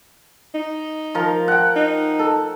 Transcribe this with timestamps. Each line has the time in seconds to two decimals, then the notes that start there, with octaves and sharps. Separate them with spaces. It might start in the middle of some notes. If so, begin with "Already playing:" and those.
0.54 D#4
1.15 F3 A#4
1.48 F#5 G5
1.76 D#4
2.19 A4